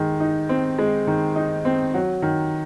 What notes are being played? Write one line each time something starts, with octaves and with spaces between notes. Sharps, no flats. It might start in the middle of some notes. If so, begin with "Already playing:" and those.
Already playing: D#3 G#3
D#4
C4
G#3
D#3
D#4
C4
F#3
D#3